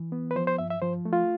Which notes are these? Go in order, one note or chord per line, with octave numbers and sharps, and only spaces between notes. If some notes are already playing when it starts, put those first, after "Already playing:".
Already playing: E3
B3
B4
F3 C5
C5
G2 E5
E5
F3 C5
A3
F4